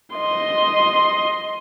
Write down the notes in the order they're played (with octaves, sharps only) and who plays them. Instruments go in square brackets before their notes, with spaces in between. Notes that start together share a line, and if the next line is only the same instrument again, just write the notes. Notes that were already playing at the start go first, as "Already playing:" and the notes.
[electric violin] D#5 C6